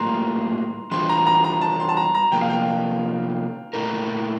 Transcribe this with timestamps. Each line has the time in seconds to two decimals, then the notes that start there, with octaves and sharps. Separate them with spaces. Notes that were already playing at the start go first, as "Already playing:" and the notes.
Already playing: A2 G3 A#3 F4 A#5 C6
0.91 E3 G3 D4 F4 C5 C6
1.09 A#5
1.27 A#5
1.44 A#5
1.61 A5
1.80 C6
1.89 A5
1.97 A#5
2.15 A#5
2.32 C3 F3 A#3 F4 G5
2.41 F5
2.50 G5
3.73 A#2 A3 E4 A#4